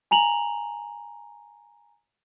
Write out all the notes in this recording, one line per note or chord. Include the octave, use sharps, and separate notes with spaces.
G#5 A#5 F7 F#7